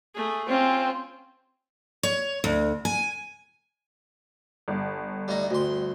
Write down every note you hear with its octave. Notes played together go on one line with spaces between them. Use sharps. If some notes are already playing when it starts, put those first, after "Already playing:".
A3 G#4
C4 C#4 F4
C#5
D2
G#5
G1
G3 A3 D#4
D2 C6